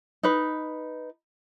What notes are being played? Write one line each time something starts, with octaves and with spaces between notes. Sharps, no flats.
D#4 B4